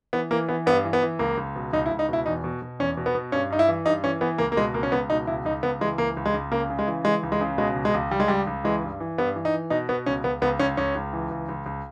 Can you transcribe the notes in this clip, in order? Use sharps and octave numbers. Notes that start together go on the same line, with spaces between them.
E3 B3
E3 A#3
E3 B3
G2 B3
E3
B3
E3
C#2 A#3
C#2
B2
C#2 D#4
E4
C#2
D#4
B2 E4
E2 D#4
B2
B2
E2 C#4
B2
B3
B2
G2 C#4
G2 D#4
E4
E3
G2 D#4
E3 C#4
E3 B3
C#2 A#3
A#3
B2 G#3
C#2 A#3
C#4
C#2 B3
B2 D#4
C#2 E4
C#2 D#4
C#2 B3
E3 G#3
C#2 A#3
C#2
G#3
C#2
C#3 A#3
C#3
G#3
E3
E3 G#3
C#2
G#3
C#3
B2 G#3
C#2
G#3
C#2
C#2 G3
G#3
C#2 G3
C#2
E3 G#3
G2
E3
G2 B3
E3
D#4
E3
B2 D#4
B2 B3
C#2 C#4
C#2 B3
C#2 B3
C#2 C#4
C#2 C#4
C#2
E3
C#2
C#2
C#2